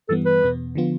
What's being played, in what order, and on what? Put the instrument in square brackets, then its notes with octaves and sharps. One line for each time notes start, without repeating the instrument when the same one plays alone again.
[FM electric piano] G2 E3 G3 B3 [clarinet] A4
[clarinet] B4
[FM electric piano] E2 B2 B3
D3 F3 B3 F4